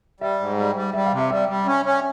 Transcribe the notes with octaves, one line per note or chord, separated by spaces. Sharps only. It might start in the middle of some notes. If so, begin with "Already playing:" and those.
G3 E5
G#2
G3
G3
G3 E5
F5
C3
E5
G3 E5
G3
C#4
C#4